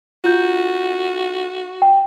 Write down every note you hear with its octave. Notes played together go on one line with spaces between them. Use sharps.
F4 F#4 G6
G5